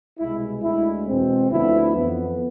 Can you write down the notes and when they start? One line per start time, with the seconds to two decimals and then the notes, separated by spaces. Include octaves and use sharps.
0.19 C2 B2 G#3 E4
0.62 D2 D3 G#3 E4
1.06 E2 B2 G#3 C4
1.49 D2 D3 F3 B3 E4
1.93 F2 E3 B3